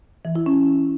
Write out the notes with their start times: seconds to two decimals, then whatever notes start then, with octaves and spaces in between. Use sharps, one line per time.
0.25 E3
0.36 E4
0.46 C#4